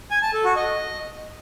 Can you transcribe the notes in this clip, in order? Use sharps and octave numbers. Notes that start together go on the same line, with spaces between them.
G#5
A5
A4
F#4
D#5